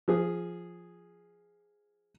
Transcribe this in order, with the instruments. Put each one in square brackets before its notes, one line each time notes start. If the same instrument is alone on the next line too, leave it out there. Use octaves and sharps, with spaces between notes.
[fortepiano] F3 G#4